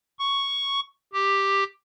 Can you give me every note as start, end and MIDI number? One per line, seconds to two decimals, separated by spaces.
0.19 0.80 85
1.13 1.64 67